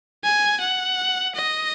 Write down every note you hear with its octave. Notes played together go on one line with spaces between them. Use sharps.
G#5
F#5
D#5